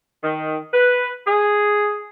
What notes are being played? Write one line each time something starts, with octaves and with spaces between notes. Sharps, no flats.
D#3
B4
G#4